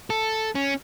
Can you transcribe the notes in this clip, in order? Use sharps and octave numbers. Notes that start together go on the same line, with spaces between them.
A4
C#4